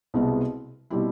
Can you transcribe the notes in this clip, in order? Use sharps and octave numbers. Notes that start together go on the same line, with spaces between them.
C2 B2 G#3 B3
B2 G3 C4 E4